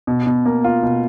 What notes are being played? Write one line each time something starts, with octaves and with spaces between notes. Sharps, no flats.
B2
B2
A#3
F4
B2